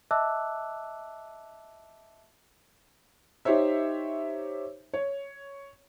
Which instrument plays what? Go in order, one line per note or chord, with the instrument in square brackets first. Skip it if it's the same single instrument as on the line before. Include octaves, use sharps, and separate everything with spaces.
[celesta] D#5 E5 A5 D6 E6 F#6
[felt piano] D#4 G4 C5 C#5 E5
C#5